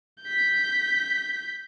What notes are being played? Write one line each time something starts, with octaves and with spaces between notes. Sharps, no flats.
G6 B6